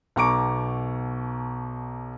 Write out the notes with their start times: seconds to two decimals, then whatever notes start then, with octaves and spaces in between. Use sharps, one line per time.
0.16 B1 B2 A#5 C#6 D6 D7